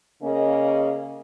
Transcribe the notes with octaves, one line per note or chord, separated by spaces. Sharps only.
C#3 A#3 C#4 G#4 D#5